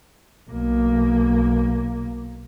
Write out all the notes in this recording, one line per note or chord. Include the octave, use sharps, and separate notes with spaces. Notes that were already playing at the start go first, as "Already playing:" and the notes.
B1 A#3